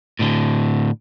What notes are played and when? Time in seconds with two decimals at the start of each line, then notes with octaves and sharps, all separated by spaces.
0.20 A2 D3